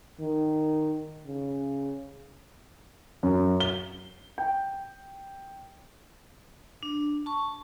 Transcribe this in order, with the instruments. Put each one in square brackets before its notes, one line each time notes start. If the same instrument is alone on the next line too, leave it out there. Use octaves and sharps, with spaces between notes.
[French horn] D#3
C#3
[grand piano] F#2
G7
G5
[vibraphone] D4
A5 C#6